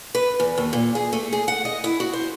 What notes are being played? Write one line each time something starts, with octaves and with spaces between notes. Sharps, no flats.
B4
E2
D#2
A#2
G#4
A3
G#4
F#5
D#5
E4
F#4
C5